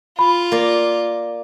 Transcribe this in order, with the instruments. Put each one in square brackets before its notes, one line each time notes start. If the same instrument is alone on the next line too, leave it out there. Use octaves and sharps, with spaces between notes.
[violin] F4 [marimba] B5
[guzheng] A#3 D5